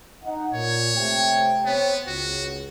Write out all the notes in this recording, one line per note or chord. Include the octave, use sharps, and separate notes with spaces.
D#4 F#5
A#2 C#5
C3 A3 G5
B3 C4 C#5
C#2 F#4